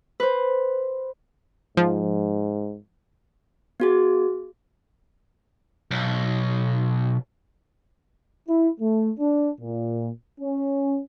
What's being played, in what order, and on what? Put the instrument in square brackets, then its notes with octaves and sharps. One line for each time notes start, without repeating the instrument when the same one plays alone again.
[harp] B4 C5
[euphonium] G#2 [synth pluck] F3
[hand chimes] B3 F#4 G#4
[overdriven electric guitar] B1
[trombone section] E4
A3
D4
A#2
C#4